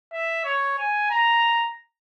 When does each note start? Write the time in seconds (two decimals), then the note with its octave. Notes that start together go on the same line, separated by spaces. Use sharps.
0.13 E5
0.45 C#5
0.79 G#5
1.11 A#5